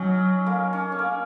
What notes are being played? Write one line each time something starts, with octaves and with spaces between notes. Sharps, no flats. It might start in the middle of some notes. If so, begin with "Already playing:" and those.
Already playing: F#3 C#4 D#4
A#3
C#4
C#4
A#3